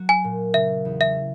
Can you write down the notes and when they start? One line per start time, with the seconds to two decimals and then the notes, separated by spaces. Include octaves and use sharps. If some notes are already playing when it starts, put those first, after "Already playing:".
Already playing: F#3 F#4
0.09 G#5
0.24 A#2
0.54 C#3 E5
0.85 E2
1.01 E5